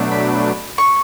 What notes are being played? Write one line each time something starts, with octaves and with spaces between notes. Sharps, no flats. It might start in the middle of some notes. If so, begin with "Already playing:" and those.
Already playing: B2 F#3 A3 D4
B5
C#6